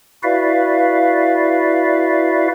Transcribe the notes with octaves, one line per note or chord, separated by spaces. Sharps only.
E4 F#4 B4 D5 E5 F5